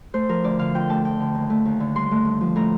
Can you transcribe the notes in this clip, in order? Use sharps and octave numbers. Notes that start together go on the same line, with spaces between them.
A3 C5
F3 A#4
D2 D5
D3 F5
F2 G5
A3 A5
F2 G5
D3
D#2
A3
D#2
D3
G2 C6
A3
G2
F3
A2 A#5